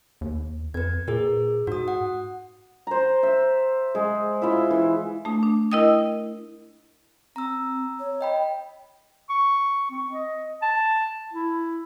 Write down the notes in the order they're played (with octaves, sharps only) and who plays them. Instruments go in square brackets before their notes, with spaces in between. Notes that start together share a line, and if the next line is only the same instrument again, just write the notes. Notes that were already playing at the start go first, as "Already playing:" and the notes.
[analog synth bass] D#2
[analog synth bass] F2 [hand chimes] B4 G#6
[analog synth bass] A#2 [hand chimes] G#4 A#4
[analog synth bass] G#2 [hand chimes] F#4 D#6
[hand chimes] F#5
[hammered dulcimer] C5 A#5
E5
G#3
E4 F4 E5
E3
[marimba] A3 D4 D#6
D4
E4 A#4 D#5 G5 D#6
[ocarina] C4 [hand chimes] A#5 E6
[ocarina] C#5
[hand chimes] D#5 G5 B5
[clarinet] C#6
C4
D#5
A5
E4